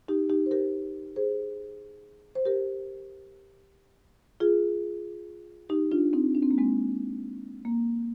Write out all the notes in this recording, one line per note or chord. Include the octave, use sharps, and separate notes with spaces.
D#4 G4
D#4 G4
C5
G4 A#4
G#4 C5
C5
G4 A#4
F4 G#4
D#4 G4
D4 F4
C4 D#4
D4
C4
A#3
G#3 C4
A#3